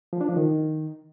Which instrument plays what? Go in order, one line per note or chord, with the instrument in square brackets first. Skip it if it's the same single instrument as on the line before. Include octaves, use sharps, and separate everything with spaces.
[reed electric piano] F3
D4
F3
D#3